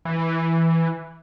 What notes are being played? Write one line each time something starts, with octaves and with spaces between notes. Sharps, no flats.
E3